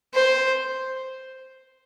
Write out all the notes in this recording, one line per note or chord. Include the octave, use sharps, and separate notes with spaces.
C5